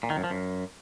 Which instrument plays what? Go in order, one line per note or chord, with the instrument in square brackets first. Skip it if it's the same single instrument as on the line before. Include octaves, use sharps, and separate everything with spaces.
[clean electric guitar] A#2
D#3
F#2
F3
F#2